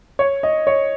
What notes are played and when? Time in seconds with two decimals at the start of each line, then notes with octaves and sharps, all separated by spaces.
0.19 C#5
0.43 D#5
0.67 C#5